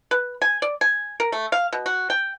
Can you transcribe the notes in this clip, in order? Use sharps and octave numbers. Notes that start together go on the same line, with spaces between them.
B4
G#5
D5
G#5
A#4
A3
F5
B2
F#4
G5